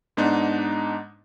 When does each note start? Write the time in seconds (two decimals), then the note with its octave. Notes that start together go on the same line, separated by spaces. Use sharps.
0.17 G#2 B3 D4 D#4